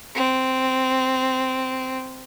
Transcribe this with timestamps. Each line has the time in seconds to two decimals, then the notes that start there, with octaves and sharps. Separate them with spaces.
0.15 C4